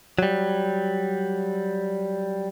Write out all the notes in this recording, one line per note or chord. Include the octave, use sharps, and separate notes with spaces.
F#3 G3